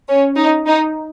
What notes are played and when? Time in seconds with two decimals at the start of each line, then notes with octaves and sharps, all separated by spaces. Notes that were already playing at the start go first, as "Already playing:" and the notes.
0.08 C#4
0.37 D#4
0.66 D#4